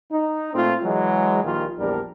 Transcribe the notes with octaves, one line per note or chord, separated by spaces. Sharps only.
D#4
A#2 A3 C4 F4
E3 F#3 G#3
A#1 A#2 D#3 G3 F4
A#1 E2 G3 D4 A#4